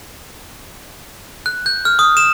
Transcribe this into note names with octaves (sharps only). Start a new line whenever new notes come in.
F#6
G6
F6
D#6
E7